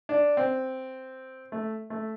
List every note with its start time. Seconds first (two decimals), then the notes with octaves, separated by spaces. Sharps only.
0.09 D4
0.37 C4
1.52 A3
1.90 A3